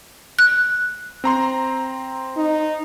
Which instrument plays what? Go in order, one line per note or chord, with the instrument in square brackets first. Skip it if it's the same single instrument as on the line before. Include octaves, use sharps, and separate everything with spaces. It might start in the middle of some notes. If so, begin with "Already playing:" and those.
[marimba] F#6
[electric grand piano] C4 A#5 C6
[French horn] D#4